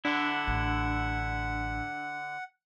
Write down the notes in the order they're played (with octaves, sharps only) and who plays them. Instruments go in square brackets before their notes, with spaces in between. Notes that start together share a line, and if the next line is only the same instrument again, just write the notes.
[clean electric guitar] D3 E4 [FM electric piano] D4 [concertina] F#5
[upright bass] A1